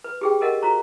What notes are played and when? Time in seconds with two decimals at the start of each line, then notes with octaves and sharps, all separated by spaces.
0.04 B4
0.21 G4 G#4 G5
0.41 G4 A4 A#4 D#5 F5 F#5
0.62 F#4 C5 A#5 C#6